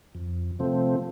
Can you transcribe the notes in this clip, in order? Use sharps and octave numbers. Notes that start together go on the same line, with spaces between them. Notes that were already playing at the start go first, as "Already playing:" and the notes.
F2
C3 F3 A3 C4